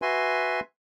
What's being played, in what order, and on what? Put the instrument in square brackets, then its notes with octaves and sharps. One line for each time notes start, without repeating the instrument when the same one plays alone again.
[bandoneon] F#4 B4 E5 G#5 C6